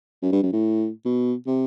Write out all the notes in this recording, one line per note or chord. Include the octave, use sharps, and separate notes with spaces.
F#2
G2
F#2
A2
B2
C3